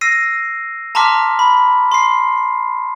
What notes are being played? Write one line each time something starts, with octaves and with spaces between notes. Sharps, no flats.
E6 A#6 C7 D#7
A5 A#5 C6 D6 F6 B6
B5
C6 C7